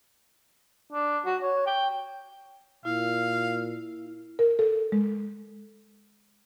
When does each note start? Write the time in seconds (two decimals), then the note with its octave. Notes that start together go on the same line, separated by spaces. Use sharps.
0.92 D4
1.26 F#4
1.42 C#5
1.67 G5
2.85 A#2 E4 F5
4.39 A#4
4.59 A4
4.92 G#3